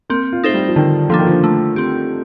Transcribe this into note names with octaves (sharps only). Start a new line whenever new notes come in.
A#3 C4
F4
A3 D#4 A4 C5
G3
F3
D3 D#3
D3 F3 A#3 D4
D#3
F3
A3
C4 G4